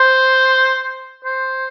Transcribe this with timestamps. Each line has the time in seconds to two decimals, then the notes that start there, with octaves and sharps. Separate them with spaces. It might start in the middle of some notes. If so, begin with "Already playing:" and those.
Already playing: C5
1.24 C5